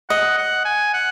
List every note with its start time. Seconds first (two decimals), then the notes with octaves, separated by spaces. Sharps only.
0.10 D#5 F#5
0.38 F#5
0.65 G#5
0.93 F#5